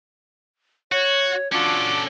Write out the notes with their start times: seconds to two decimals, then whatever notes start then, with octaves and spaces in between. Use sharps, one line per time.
0.92 F#4 C#5
1.52 C#4 D4 F4 F#4 A4 D6